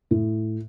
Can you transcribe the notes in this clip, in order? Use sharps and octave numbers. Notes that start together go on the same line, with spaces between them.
A2